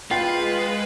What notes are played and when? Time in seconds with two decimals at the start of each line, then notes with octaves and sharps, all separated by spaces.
0.11 G#3 F4 B4 G5